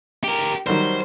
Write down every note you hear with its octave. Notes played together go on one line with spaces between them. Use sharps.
G4 A#4
D#3 F#3 G3 C5